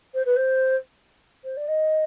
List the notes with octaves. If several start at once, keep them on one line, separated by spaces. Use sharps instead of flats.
C5
B4
C5
C5
D5
D#5